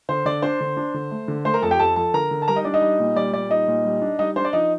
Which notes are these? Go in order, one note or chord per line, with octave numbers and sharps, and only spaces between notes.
D3 C5
D3 D5
D4 C5 C6
D3
D4
D3
A3
D3
A3 C5 C6
A#4 A#5
F2 A4 A5
G4 G5
F2 A4 A5
F3 A4 A5
D3 A#4 A#5
D3
A5
G3 A#4 A#5
D#4 D#5
D4 D5
D#4 D#5
G3
A#2
G3 D5
A#2 D5
G3 D#4 D#5
A#2
G3
D4
G3 D#4 D#5
D4 C5
D5
F3 D#4 D#5